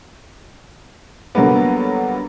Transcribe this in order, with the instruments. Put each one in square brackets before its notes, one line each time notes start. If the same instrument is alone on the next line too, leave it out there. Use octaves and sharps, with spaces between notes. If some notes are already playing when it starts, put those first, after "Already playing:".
[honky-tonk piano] D3 F#3 G3 A#3 B3